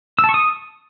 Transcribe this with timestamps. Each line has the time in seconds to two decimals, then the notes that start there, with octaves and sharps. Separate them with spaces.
0.19 E6
0.24 A5
0.29 C#6
0.34 D#6